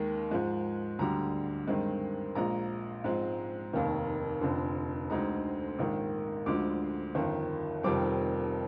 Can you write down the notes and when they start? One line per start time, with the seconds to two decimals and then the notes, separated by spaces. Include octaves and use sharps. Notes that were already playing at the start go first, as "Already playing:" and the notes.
Already playing: D#2 D#3 G#3
0.31 G#2 F3 G#3
0.99 D2 D3 G3 A#5
1.67 G2 D#3 G#3 C4
2.35 A#1 A#2 G#3 A#5
3.04 G#2 F3 G#3 C4
3.73 F1 D#2 D#3 A#3
4.41 F1 F2 D3
5.10 D2 D3 G#3 C4 D#4 A#5
5.79 A#1 G#2 D#3
6.46 D2 D3 F3 G#3 D6
7.15 G1 F2 D#3
7.83 F1 F2 D#3 G3 C4 D6